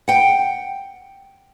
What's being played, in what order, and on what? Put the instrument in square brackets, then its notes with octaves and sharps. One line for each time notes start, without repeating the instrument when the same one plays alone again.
[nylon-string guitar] F#5 G5